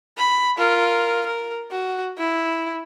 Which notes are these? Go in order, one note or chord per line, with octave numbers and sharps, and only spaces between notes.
B5
F4 A#4
A#4
F#4
E4